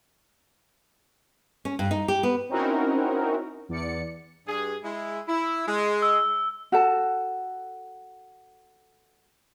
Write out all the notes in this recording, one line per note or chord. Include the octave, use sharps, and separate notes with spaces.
C#4
G2
D#4
G4
B3
C4 C#4 D#4 E4 F#4 A#4
E2 D5 C#7
G2 G#4
G#3 E4
E4
G#3
E6
F#4 A4 A5